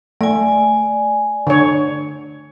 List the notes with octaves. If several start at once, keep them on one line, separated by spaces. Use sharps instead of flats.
A3 D5 G#5
D3 C#5